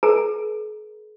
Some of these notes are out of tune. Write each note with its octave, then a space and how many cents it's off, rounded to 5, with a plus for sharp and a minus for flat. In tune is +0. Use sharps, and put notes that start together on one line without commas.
G#4 +45 B4 -45 A#5 +0